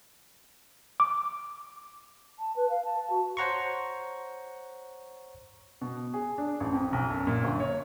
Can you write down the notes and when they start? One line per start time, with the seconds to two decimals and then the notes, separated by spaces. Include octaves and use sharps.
1.00 D6
2.39 A5
2.56 B4
2.70 F5
2.85 A5
3.10 F#4
3.37 C5 C#5 F#5 A#5 C6 C#6
5.81 B2
6.14 G#4
6.38 D4
6.60 A1
6.73 F2
6.93 B1
7.10 F#2
7.27 A#2
7.44 G1
7.60 C#5